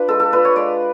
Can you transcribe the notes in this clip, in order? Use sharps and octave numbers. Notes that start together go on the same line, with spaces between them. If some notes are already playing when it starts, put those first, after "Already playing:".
Already playing: D4 F4 B4
G#3 A4
A4
D4 F4 B4
C#5
G#3 D5